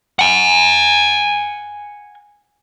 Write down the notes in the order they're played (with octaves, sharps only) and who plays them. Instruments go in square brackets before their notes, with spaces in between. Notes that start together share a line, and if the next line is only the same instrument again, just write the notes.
[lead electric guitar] F#5 G#5